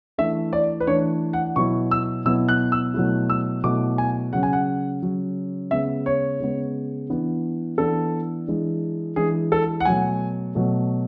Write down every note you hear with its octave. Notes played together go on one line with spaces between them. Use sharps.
E3 A3 D4 E5
D5
B4
E3 A3 D4 C#5
F#5
B2 F#3 B3 E4 C#6
E6
B2 F#3 B3 E4 E6
F#6
E6
B2 F#3 A3 E4
E6
B2 F#3 A3 E4 D6
G#5
C#3 F#3 C#4 F#5
G#5
F#5
C#3 F#3 C#4
C#3 G#3 B3 E5
C#5
C#3 G#3 B3
E3 B3 D4
E3 B3 D4 A4
E3 G#3 D4
E3 G#3 D4 G#4
A4
F#5
B2 F#3 A3 G#5
B2 F#3 A3